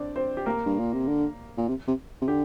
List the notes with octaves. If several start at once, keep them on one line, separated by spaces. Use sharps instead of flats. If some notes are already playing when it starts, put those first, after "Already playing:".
Already playing: C4 D4 D5
C4 C5
G4
A#3 A#4
G2
A#2
C3
D3
A#2
C3
C3
C3
D3 G4